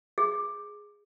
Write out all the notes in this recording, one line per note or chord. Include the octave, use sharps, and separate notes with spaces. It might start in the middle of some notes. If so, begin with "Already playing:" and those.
G#4